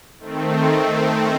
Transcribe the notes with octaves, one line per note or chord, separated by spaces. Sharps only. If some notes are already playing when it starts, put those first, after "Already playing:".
D#3 A3 C4